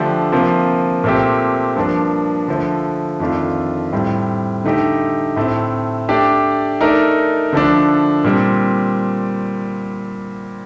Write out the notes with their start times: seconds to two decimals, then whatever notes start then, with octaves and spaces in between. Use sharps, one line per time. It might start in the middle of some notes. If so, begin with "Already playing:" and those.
Already playing: D3 F3 A3 D4 G4
0.32 C3 F3 A#3 F4
1.04 A#2 A3 C4 G4
1.76 G2 F3 A#3 D4
2.48 D3 F3 A3
3.20 F2 D#3 A3 D4 F4
3.92 A2 G3 C4
4.64 D3 A3 D#4 G4
5.36 A2 A3 C4
6.09 A3 D4 G4 D5
6.81 A3 D#4 A#4 D5
7.53 D3 F3 A3 D4
8.24 A#2 G3 C4